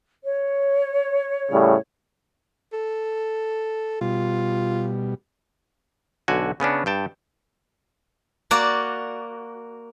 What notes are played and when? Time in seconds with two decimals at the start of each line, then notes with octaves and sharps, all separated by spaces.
0.23 C#5
1.50 A2 C#3 G3
2.73 A4
4.01 B2 G3 F4
6.28 B1 D3 F#4 G#5
6.60 C#3 B3 C#4 D4
6.86 G2 G5 A5
8.51 A#3 F#4 D5